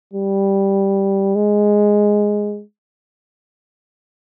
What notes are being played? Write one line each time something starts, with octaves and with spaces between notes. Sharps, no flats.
G3
G#3